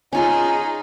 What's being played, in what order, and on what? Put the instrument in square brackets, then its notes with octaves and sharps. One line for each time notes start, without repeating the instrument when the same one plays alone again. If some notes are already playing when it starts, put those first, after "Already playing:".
[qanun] C#4 F4 C6 [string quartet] D#4 G#4